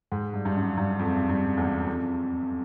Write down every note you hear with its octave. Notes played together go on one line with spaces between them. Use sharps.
G#2
G2
G2
F#2
G2
F2
G2
E2
F2